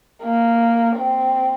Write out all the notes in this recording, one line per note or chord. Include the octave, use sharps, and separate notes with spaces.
A#3
C4